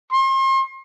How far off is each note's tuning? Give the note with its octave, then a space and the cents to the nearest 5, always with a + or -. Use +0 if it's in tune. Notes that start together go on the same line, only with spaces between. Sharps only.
C6 +40